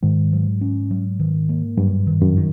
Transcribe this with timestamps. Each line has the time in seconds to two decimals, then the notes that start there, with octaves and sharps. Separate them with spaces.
0.03 G#2 D#3
0.32 F#3
0.61 C#4
0.91 F#3
1.20 D#3
1.49 A#3
1.77 G2 F#3
2.07 D#3
2.22 F#2
2.37 D#3